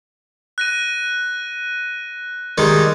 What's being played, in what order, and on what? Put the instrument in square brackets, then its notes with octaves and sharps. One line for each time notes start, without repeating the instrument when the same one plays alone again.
[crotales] F#6 A#6 D#7
[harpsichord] D#3 G3 G#3